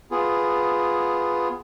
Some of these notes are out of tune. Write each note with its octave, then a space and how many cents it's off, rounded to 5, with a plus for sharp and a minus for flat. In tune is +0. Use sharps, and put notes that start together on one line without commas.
B3 +10 F4 +0 G#4 +0